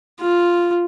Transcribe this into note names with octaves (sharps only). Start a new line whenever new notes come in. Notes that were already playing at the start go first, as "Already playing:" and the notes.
F4